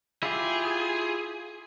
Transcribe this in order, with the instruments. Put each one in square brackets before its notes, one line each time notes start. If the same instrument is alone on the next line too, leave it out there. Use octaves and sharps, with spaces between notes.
[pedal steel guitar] E4 F4 G4 [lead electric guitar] G#4